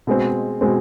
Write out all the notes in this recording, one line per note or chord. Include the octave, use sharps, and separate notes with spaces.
B2 G#3 C4
B2 G#3 C4